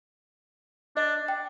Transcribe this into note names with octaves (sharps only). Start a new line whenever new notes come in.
D4 D#5
G5